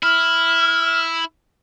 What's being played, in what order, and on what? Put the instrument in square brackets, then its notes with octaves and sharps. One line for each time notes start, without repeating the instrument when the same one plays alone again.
[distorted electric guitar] E4 [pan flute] F6